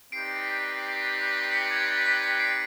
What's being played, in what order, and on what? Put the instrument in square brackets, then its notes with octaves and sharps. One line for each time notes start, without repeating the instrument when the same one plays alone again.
[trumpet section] C4 D#4 G4 B4 D5 [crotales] C7 D7
[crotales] B6 C#7
G#6
A6
B6
B6 C#7
C7 D7